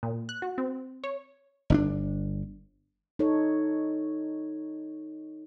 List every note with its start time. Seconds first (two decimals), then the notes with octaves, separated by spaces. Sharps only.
0.03 A#2
0.29 F#6
0.42 F#4
0.58 C4
1.04 C#5
1.70 G1 C#4 D4
3.19 D#4 A4 C#5